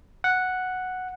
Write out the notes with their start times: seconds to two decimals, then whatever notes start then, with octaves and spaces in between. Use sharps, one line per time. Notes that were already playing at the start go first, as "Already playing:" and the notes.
0.24 F#5